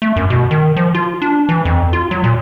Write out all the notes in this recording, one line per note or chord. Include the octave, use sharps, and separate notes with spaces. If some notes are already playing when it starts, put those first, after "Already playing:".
A3
F#2
B2
D#3
F3
F4
D4
E3
F2
F4
F#3
A#2